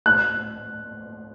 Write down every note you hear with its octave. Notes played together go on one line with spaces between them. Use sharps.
F#6